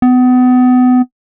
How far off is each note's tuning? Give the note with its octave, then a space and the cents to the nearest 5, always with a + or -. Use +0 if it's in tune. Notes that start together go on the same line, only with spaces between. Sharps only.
B3 +30